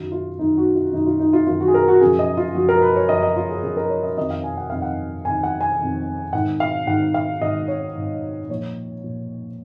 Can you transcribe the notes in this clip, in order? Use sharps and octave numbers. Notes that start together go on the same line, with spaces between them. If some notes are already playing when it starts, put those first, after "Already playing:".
Already playing: F#2 D#3 F#4
F4
F#2 D#3 D#4
F#4
F4
F#2 D#3 D#4
F4
D#4
F4
F#2 D#3 F4
F#4
G#4
A#4
F#4
F#2 C#3 F3 G#4
D#5
F4
F#2 C#3 F3 F#4
A#4
B4
C#5
F#2 C#3 F3 D#5
D#5
F4
G#4
F#2 C#3 F3 G#4
A#4
C#5
D#5
F2 D#3 D#5
F5
G#5
F#5
F2 D#3 F5
F#5
F2 D#3 G#5
F#5
G#5
F2 D#3
G#2 D#3 F#5
F5
G#2 D#3 F#5
F5
G#2 D#3 D#5
C#5
G#2 D#3
A#2 F3 C#5
A#2 F3